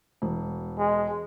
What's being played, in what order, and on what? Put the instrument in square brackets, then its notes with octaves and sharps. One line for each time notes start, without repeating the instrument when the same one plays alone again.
[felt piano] E1
[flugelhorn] G#3